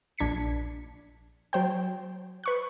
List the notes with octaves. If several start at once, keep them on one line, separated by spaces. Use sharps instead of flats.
A#1 D4 G#6 B6 C#7
F#3 C5 G5
B4 C#6 F#6